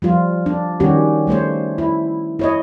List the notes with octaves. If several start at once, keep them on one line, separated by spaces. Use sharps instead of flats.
F3 G3 F4
D4
D#3 G3 C#4 F#4 G4
G3 A3 C5 C#5
E4
E4 C#5 D#5